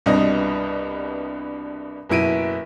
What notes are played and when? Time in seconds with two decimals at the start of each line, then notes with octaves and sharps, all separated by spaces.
0.06 C2 G2 B2 G3 B3 D#5
2.09 F#1 B2 E4 D7 D#7